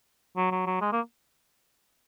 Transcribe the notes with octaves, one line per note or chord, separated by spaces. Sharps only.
F#3
F#3
F#3
G#3
A#3